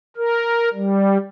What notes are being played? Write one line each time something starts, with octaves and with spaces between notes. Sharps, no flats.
A#4
G3